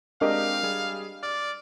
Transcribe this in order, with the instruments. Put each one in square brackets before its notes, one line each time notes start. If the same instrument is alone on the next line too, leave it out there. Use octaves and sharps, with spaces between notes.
[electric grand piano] G#3 C4 G4 [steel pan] D4 A#4 D#5 [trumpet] F5
[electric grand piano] G3 G#4
[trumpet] D5 [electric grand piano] F6